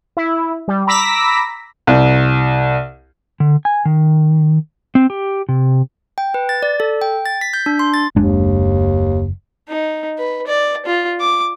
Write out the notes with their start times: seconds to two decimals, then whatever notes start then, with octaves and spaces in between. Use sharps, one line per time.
0.17 E4
0.68 G3
0.87 A#5 B5 D6 E6 A#6 B6
1.87 C2
3.40 D3
3.65 G#5
3.85 D#3
4.95 C4
5.10 G4
5.49 C3
6.18 G5
6.34 B4
6.49 A6
6.63 D5
6.80 A4
7.02 G5
7.26 A6
7.41 B6
7.53 G6
7.66 D4
7.79 C6
7.94 A6
8.16 F#1 D#2 G#3 D4
9.69 D#4
10.18 B4
10.47 D5
10.86 F4
11.20 D6